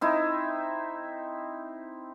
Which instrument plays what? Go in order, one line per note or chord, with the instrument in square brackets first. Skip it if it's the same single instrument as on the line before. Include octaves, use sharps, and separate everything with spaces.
[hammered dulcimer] C4 D#4 E4